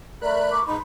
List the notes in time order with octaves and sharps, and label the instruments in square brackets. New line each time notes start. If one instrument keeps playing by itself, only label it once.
[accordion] A3 B5 F#6 [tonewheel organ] A#4 [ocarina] D5
[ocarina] C#6 [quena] D6
[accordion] G#2 D#4 [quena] B5 [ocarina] C6